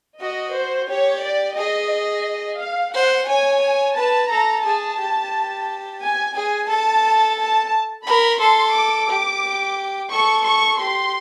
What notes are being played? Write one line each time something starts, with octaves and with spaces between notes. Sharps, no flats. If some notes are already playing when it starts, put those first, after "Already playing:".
F#4 D#5
C5
G4 C#5
D5
G#4 D#5
D#5
F5
C5 F#5
C#5 G#5
G#5
B4 A5
A4 A#5
G#4 A5
G4
G#5
G#4 G#5
A4 A5
A5
A#4 B5
A4 C6
D6
G4
A4 C#6
C#6
G4 C6